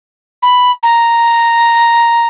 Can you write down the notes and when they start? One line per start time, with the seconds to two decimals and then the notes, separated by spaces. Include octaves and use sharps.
0.42 B5
0.83 A#5